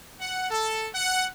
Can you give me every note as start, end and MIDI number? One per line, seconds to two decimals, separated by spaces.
0.20 0.47 78
0.50 0.89 69
0.95 1.27 78